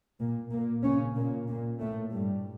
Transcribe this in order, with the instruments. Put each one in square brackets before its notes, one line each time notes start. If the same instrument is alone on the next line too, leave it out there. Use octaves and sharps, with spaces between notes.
[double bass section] A#2 A#3
A#2 A#3
C#3 C#4
A#2 A#3
A#2 A#3
A2 A3
G2 G3